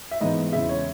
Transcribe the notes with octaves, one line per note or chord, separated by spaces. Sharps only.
E5
G#2 E3 B3 D#4 D#5
E2 C#3 G#3 E5
C#5